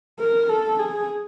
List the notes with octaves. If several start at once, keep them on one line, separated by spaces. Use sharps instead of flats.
A#4
A4
G#4